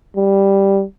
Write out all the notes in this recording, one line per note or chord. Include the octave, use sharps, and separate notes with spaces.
G3